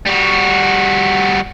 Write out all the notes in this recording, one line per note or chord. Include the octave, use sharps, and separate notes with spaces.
G3 F#4